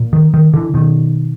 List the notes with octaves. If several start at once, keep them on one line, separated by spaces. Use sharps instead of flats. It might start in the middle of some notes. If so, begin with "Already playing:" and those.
Already playing: A#2
D#3
D#3
D3 E3
B2 D#3